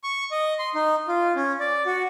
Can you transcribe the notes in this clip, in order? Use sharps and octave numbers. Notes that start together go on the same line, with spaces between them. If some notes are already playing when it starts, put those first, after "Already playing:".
C#6
D#5
C6
D#4
F4
C#4
D5
F#4